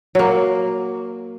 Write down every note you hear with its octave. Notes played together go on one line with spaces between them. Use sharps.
F#3 A#3